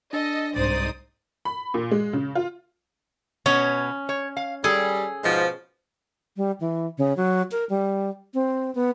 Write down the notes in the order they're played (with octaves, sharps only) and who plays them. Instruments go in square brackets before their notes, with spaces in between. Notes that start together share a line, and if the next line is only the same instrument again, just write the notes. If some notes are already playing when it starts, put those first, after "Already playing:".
[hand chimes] D4 [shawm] A4 [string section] D#5
[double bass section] C2 G#2 [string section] D#4 C5 D#6 [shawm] D5
[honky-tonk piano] B5
A#2
G#3
C#3
F4
[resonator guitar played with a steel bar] B2 B3 C#5 [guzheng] C#4
[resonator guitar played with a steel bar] C#5
F5
[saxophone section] G3 [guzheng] G#4 [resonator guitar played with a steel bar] A4
[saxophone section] G#2 B2 F3
[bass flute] G3
E3
C#3
F#3
A#4
G3
C4
B3